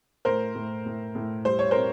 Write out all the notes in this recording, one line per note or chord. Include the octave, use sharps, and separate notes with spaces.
A2 A#4 C5
A2
A2
A2
G3 C5
C#5
C4 A#4 C5